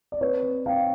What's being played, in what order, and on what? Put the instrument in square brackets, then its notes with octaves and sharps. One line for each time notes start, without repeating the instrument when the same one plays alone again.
[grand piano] D5
C4 B4 C#5
C4
C4 F5 G5